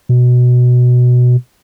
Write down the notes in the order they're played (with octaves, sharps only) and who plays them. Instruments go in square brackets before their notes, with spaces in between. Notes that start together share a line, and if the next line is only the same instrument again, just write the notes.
[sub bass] B2